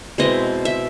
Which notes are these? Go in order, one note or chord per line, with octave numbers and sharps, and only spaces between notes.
B2 G#3 C4 E4 D#5
E5